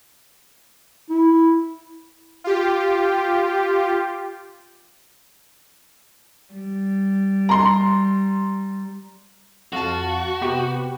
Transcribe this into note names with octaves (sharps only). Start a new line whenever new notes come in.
E4
F4 G4
G3
A#5 C6
F2 F#4 F5 A5
C3 B3 G4